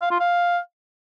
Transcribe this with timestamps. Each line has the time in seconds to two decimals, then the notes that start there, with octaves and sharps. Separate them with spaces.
0.02 F5
0.11 F4
0.20 F5